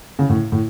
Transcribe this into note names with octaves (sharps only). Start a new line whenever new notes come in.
C#3
A2
A2